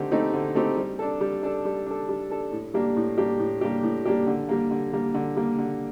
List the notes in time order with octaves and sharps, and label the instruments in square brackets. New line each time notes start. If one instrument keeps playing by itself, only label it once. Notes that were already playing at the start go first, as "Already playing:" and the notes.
Already playing: [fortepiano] D3 A3 C4 D#4 G4
A3 C4 D#4 G4
D3
A3 C4 D#4 G4
G3
D4 A4
G3
D4 A4
G3
D4 A4
G3
D4 A4
A2
G3 A#3 D4 G4
A2
G3 A#3 D4 G4
A2
G3 A#3 D4 G4
A2
G3 A#3 D4 G4
D3
G3 A#3
D3
G3 A#3
D3
G3 A#3
D3